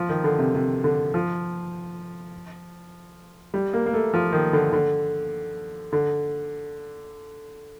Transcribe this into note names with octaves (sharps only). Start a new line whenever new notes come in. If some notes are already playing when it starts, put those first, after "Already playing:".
Already playing: F3
D#3
D3
C3
C3
D3
F3
G3
A#3
A#3
A3
F3
D#3
D3
D3
D3